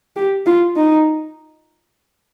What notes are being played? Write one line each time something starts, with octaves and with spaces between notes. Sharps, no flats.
G4
F4
D#4